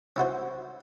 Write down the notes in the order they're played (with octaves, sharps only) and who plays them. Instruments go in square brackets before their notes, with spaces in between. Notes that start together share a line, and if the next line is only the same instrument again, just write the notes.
[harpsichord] C#4 E4 F#4 C5